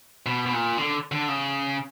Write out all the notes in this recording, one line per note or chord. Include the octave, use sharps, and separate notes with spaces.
B2
B2
A#2
D3
D3
C#3